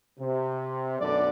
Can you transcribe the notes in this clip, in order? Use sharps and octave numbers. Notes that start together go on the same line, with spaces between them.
C3
B1 F#2 D3 A3 D5